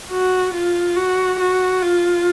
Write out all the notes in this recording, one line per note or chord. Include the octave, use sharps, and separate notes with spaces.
F#4
F4
F#4
F#4
F4